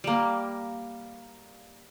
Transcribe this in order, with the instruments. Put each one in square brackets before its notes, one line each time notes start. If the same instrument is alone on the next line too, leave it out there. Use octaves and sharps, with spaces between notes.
[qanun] G3 A#3